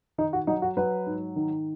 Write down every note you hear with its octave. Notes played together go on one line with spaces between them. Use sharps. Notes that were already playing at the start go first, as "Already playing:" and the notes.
D#3 D#4
F#4
F#3 D#4
F#4
F#3 B4
G#2
D#3